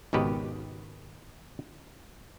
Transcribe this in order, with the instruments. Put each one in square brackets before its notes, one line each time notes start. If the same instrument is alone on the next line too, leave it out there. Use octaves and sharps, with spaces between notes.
[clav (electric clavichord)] G#1 C#2 B2 D#3 G4 B4